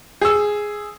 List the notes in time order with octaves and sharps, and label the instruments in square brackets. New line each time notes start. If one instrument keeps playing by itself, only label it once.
[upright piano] G#4 E6